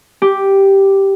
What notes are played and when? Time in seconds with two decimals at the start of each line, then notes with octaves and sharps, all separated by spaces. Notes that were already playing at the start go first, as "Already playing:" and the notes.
0.22 G4